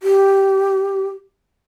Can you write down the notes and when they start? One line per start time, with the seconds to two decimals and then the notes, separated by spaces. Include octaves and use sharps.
0.03 G4